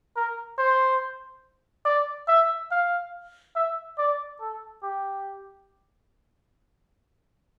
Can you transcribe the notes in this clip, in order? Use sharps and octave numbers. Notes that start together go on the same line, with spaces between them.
A#4
C5
D5
E5
F5
E5
D5
A4
G4